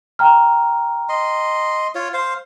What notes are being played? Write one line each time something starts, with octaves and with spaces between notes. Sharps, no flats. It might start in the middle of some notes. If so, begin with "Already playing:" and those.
G5 A#5 F6
D#5 C6
F4 C#5
C5 F5